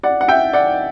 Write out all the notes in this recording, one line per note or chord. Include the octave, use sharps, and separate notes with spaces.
D5 F#5
F#5
E5 G5
D5 F#5